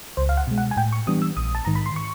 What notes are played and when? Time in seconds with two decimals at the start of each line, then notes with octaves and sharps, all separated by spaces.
0.17 C#2 C5
0.29 F5
0.37 F#5
0.47 B2 G#3
0.58 F#5
0.71 G#5
0.77 A2 G5
0.92 C#6
1.07 E3 G3 B3 D4 D#6
1.22 E6
1.37 A#1 D#6
1.55 A5
1.65 G#2 D#3 A#5
1.75 B5
1.86 C6
1.96 C#6